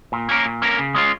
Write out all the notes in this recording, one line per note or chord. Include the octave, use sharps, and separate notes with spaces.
A#2
A#3 C#4 A#4
A#2
A#3 C#4 A#4
C#3
G#3 C#4 F4